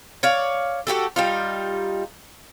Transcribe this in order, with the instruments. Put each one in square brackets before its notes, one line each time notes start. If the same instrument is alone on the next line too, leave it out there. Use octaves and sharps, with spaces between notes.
[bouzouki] C#5 D5 F5
A3 F#4 G4 A4
G3 D#4 F4